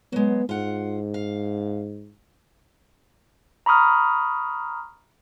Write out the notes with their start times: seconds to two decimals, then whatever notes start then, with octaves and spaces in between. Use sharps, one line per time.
0.12 F#3 G#3 B3
0.49 G#2 F4 F#5
1.14 F5
3.66 A#5 B5 C#6 D#6 F6